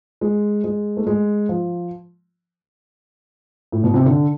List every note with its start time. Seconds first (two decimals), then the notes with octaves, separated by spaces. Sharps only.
0.21 G#3
0.64 G#3
0.97 A3
1.07 G#3
1.49 F3
3.72 A2
3.84 B2
3.94 C3
4.05 D3